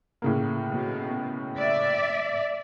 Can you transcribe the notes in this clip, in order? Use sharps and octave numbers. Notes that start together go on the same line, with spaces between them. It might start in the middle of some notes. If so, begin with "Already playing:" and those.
A2 C#3 A#3
B2
D5 E5